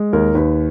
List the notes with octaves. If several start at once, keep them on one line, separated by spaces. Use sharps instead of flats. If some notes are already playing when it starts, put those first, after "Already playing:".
Already playing: G#3
D#2 A#4
D#2 B4